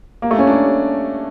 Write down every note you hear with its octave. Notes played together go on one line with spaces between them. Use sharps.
A#3
A3
C#4
D4